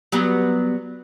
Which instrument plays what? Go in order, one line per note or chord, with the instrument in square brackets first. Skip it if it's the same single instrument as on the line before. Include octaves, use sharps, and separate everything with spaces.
[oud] F#3 G3 B3